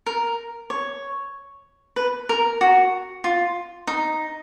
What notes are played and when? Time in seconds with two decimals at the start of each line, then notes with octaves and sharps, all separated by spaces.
0.06 A#4
0.70 C#5
1.96 B4
2.29 A#4
2.61 F#4
3.24 F4
3.87 D#4